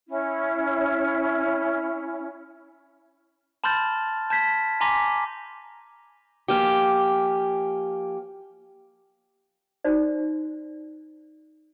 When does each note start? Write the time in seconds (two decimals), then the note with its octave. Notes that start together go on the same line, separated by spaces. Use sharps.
0.08 C#4 E4
3.64 A5 B5 C6 F6 G6 A6
4.30 A5 G6 G#6 B6
4.81 G#5 A#5 C6 D6 A#6 B6
6.48 F3 A#3 C#4 G4
9.84 D#4 F#4 C5 D5